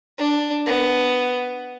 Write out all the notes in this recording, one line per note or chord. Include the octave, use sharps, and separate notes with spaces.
D4
B3